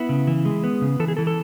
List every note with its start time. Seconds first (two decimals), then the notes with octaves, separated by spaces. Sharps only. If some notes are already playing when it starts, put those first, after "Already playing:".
Already playing: B3 E4
0.09 C#3
0.27 E3
0.45 G#3
0.64 B3
0.81 C#3
1.00 E3 A4
1.08 G#4
1.17 E3 A4
1.27 A4